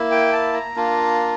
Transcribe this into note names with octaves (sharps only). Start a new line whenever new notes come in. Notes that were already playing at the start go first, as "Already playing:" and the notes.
Already playing: A#3 E4
G5
A5
A#5
A#3 D4 F4